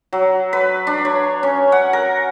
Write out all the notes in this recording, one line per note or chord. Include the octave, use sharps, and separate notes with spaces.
F#3
B4
D4
C#5
C#4
F#5
A#4